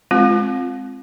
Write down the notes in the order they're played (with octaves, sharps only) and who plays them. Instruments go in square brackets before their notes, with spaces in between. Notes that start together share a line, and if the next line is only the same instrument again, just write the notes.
[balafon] G#3 C4 F4